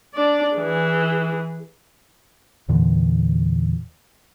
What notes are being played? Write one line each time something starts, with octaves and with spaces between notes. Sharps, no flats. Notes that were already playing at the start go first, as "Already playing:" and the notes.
D4 D5
E3 G#4
E2 A#2 D3 E3